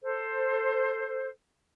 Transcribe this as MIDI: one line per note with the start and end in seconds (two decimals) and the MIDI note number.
0.03 1.29 69
0.03 1.29 72